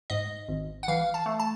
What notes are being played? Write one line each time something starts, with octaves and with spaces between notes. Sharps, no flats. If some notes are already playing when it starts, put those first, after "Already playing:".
G#2 D#5
G#1
F#5
E3 F5
A5
A3
A5